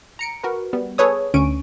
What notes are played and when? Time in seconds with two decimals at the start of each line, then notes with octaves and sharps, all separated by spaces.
0.19 A#5 C#7 D7
0.44 F#4 A#4 B4
0.73 G3 B3
0.98 G#4 A4 B4 C#5 D#6
1.34 D2 D3 C#4 C#6 D7 D#7